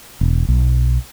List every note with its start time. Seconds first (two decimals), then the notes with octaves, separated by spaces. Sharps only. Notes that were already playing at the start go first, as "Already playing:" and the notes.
0.21 E1
0.48 B1